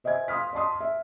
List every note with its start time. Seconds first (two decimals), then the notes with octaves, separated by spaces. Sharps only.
0.04 C5 D#5 E5 G#5 G#6
0.28 F5 C6 D#6 F6 B6
0.53 D5 D#5 A5 C6 D#6
0.80 E5